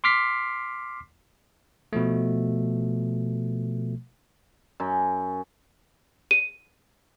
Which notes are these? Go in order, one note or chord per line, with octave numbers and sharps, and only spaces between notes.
C6 D6 F6 B6 C7
B2 F3 A3
F#2
D#7